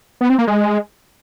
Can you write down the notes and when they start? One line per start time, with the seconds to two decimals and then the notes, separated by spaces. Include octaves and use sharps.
0.21 B3
0.30 C4
0.39 A#3
0.47 G#3